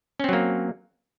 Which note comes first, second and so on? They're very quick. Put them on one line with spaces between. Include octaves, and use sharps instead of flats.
C#4 C4 F#3 A#3